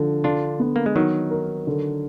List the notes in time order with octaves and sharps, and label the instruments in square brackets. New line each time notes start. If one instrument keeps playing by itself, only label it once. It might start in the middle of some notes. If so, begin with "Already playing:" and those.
Already playing: [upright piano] D3 F3
[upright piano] D3 [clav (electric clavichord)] D4 F4
[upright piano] B3
[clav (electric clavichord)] A#3
G#3
[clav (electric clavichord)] D#3 F#3 [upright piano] D#4
[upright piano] A#4
D3